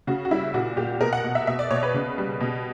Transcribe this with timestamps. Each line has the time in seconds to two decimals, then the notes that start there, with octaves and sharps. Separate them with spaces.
0.07 C#3 F#4
0.25 F#4
0.31 G3 E4
0.54 A#2 F#4
0.77 A#2 G4
1.01 B2 A#4
1.13 F#5
1.24 B2
1.35 E5
1.47 B2 E5
1.59 D5
1.71 B2 C#5
1.83 B4
1.94 C#3
2.18 G3
2.40 B2